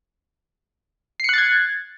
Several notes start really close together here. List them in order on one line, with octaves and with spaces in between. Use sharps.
C7 C#7 F#6 A6 G#6